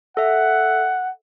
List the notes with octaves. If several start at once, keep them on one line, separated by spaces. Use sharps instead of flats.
A4 E5 F#5